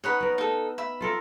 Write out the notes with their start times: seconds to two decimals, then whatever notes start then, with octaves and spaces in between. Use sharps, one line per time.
0.04 B3 D#4 C#5 D#5 F#5 B5
0.20 B3 A#4
0.38 D#4 A4
0.78 E5 B5
1.01 F4 A4 A#4